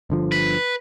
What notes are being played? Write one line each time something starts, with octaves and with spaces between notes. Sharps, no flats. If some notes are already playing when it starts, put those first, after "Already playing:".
G1 D3 F3
B4